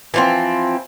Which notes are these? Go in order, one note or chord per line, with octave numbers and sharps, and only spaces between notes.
E3 F3 C4